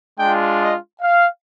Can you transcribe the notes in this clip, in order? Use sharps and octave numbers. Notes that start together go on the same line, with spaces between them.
G#3 D4 F4 G5
D#5
F5